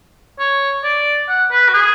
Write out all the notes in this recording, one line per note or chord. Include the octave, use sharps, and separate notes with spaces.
C#5
D5
F#5
B4
F#4
G#4